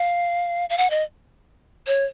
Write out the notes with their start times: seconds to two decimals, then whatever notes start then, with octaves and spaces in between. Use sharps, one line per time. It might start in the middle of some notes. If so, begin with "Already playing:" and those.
Already playing: F5
0.70 F5
0.78 F#5
0.90 D#5
1.87 C#5